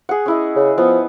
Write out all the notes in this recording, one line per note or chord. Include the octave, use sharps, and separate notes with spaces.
G#4 F#5
C#4 E4 D#5
C#3
F3 B3